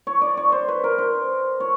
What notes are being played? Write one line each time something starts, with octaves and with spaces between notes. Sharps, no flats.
C#5
D5
C#5
C5
B4
A#4
C5
C#5